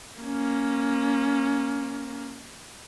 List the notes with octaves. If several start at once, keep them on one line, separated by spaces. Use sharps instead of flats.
A#3 C#4